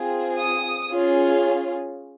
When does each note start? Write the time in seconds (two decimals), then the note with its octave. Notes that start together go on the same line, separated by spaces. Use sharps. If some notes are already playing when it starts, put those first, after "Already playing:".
Already playing: C4 F4 G#4
0.37 D#6
0.89 C#4 F4 G#4